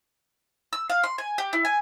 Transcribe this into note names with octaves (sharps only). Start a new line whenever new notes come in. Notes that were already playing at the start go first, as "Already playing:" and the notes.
E6
F5
C6
G#5
G4
E4
G#5